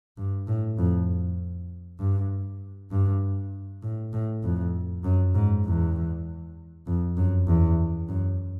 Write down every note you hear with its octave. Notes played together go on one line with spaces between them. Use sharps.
G2
A2
F2
G2
G2
A2
A2
F2
F#2
G#2
E2
F2
F#2
E2
F#2